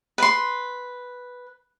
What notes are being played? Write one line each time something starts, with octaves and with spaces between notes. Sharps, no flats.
B4 C6